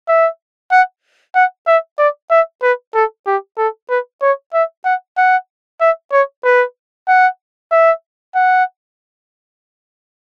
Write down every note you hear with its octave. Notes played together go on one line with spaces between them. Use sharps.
E5
F#5
F#5
E5
D5
E5
B4
A4
G4
A4
B4
C#5
E5
F#5
F#5
E5
C#5
B4
F#5
E5
F#5